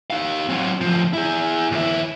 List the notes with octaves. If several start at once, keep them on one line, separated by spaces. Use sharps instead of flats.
D#4 F5
F#3 C4
D2 F3
E4 G#4
D#2 E4